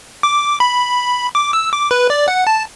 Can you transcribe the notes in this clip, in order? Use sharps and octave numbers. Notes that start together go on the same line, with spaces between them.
D6
B5
D6
E6
D6
B4
D5
F#5
A5